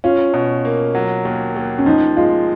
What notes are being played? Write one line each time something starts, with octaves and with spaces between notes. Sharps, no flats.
C#4 F4
B2
A#3
F#3
D#2
D#2
C#4
F3 D#4
G#3 F4